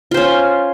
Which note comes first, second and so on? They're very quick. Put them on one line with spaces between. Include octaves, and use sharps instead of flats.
F4 C5 C#4